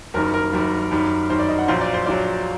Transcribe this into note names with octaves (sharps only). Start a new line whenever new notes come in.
F#1 F#2 D#3 G3 A#4
A#4
F#1 F#2 D#3 G3
F#2 D#3 G3
F#2 D#3 G3 C5
D5
D#5
F#5
A#1 A#2 F#3 C5
D5
C5
A#1 A#2 F#3 D5